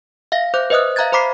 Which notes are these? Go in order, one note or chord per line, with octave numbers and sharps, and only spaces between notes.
E5 F5 A#6
C5 D6 F#6 G6
B4 C5 D#5 E5 D#6 F#6
E5 F5 A#5 F#6 G#6 A6
C5 A#5 B5 D6 B6 C7